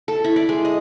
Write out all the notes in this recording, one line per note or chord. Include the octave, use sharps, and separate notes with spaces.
A4
E4
D5
G#3
D#5